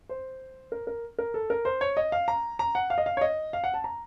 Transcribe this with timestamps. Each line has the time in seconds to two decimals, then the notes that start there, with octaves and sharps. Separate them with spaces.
0.09 C5
0.72 A#4
0.87 A#4
1.18 A#4
1.34 A4
1.50 A#4
1.65 C5
1.81 C#5
1.97 D#5
2.12 F5
2.28 A#5
2.59 A#5
2.75 F#5
2.90 F5
2.98 D#5
3.06 F5
3.17 C#5
3.21 D#5
3.53 F5
3.64 F#5
3.74 A5
3.84 A#5